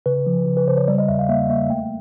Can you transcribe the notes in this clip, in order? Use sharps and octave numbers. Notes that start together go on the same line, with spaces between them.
C#3 B4
F3
C#3
B4
C#3 C5
C#5
G3 D5
D#5
E2 E5
F5
A#3 E5
A#3 E5
A3 G5